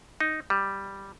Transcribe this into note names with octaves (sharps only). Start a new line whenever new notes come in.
D#4
G3